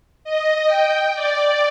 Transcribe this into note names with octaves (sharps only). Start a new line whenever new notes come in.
D#5
G5
D5